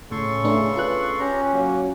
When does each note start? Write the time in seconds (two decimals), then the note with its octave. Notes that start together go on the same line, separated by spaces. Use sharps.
0.11 A2 C#3 A4 C6 C#6
0.44 E2 A3 D4 B4
0.77 F4 B4 F#6
1.20 C#4 G4 A#5
1.54 F#3 A#3